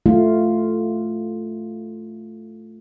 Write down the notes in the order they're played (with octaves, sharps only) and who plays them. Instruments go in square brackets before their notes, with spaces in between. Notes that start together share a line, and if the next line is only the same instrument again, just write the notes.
[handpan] A3 F4